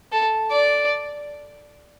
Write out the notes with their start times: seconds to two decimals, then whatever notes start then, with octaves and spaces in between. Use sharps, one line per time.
0.12 A4
0.52 D5